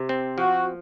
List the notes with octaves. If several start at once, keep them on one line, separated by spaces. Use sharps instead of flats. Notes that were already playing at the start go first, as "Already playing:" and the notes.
Already playing: C3
C4
F3 F#4